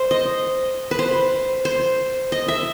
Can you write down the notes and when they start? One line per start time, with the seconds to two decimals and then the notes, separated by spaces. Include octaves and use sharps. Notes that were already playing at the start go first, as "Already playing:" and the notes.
Already playing: C5
0.11 D#5
0.91 B4
0.99 C5
1.65 C5
2.32 D#5
2.48 E5